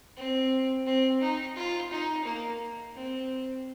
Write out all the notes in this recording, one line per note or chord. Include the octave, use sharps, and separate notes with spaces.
C4
C4
D#4
F4
D#4
A#3
C4